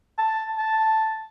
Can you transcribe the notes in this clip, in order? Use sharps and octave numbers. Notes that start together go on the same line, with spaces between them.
A5
A5